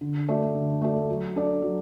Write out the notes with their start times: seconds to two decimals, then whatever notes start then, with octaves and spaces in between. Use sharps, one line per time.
0.01 D3
0.28 A3 F#4 A4 D5
0.55 D3
0.82 A3 F#4 A4 D5
1.09 F#3
1.36 D4 A4 D5
1.62 F#3